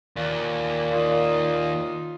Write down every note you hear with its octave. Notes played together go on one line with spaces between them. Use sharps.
D#2 A#2
D#4 F4